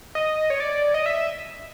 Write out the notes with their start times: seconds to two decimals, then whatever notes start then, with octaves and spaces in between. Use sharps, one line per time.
0.15 D#5
0.50 C#5
0.60 D5
0.94 D#5
1.06 E5